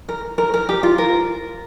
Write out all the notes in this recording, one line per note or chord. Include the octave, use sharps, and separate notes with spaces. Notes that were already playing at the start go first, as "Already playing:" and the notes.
A#4
A#4
A#4
G4
F4
A#4